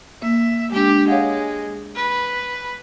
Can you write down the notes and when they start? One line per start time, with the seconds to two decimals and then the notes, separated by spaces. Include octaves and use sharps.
0.22 A#3 E5
0.72 G#3 D4 G4
1.08 G#3 C#5 F5 F#5
1.96 B4